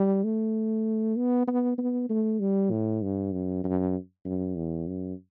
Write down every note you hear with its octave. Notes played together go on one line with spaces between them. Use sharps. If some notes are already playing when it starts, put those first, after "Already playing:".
Already playing: G3
A3
B3
B3
B3
A3
G3
A2
G2
F#2
F#2
F#2
E2
F#2